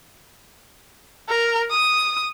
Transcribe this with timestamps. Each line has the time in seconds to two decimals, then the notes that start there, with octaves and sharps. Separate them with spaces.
1.29 A#4
1.71 D#6